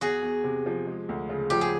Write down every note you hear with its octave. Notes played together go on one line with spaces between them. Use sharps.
E2 F#4 G#4
E2
C3
F3
G#3
D2
C#3
F3 G4
G#4